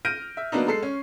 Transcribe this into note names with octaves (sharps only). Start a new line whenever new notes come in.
F6 G6 A#6 D7 D#7
E5
F#3 A#3 B3 D4 D#4
G#3 A4 C7
C#4